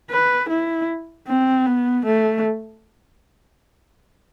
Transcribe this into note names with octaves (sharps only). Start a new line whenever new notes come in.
B4
E4
C4
B3
A3